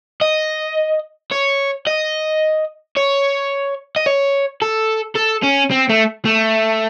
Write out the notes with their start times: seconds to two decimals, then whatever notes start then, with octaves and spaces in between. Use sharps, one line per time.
0.22 D#5
1.31 C#5
1.87 D#5
2.96 C#5
3.96 D#5
4.06 C#5
4.62 A4
5.16 A4
5.44 C#4
5.71 C4
5.90 A3
6.26 A3